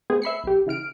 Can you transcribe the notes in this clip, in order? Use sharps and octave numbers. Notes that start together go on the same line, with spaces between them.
A3 B3 C4 G#4
E5 B5 C7 C#7
B1 G4
C#3 E3 F6 D7